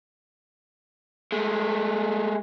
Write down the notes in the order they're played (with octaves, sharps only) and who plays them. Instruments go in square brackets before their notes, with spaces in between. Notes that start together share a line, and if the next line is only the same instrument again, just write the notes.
[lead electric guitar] G#3 A3